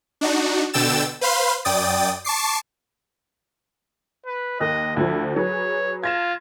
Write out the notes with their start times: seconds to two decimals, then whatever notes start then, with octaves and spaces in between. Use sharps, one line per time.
0.21 D4 D#4 F#4
0.73 B2 D3 G5 E6 A6 E7
1.21 B4 C5 F5 B5 C6
1.65 F#2 D5 G5 D#6 A6
2.24 A5 C#6 D6 C7
4.26 B4
4.60 D#2 A#3 D#5 F#6
4.97 D2 F3 E4
5.36 F#3 G#4 B4 C#5
6.04 F4 G#6 A#6 E7